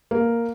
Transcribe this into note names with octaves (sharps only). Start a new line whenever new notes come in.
A#3